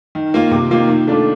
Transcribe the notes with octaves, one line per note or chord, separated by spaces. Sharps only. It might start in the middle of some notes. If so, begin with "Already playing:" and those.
D#3
A#3 F4
C3
D#3 A#3 F4
D#3
A3 D4 F4